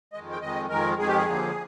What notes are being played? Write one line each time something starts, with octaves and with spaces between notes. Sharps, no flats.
F2 D#3 G#3 D#5
G5
F2 D#3 G#3 D#5
F2 D#3 G#3 A#4
F2 D#3 G#3 G#4
G4
G#4
D#2 D3 F3 A#3